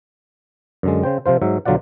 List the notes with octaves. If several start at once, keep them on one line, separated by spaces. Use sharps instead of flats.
F#2 D3 G#3
C#3 C5 G5
C3 F3 F4 C5
G#2 F#3 E5
B1 D3 F#3 F4 D5 F#5